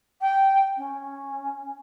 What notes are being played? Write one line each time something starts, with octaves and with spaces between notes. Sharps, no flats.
G5
C#4